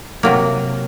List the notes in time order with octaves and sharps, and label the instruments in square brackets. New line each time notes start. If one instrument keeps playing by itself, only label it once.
[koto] C3 F#3 A#3